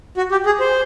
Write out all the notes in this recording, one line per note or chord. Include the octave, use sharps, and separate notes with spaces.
F#4
G4
G#4
C5